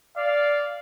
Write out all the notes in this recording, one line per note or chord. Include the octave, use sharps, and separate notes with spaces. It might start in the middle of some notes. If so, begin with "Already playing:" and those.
D5 F5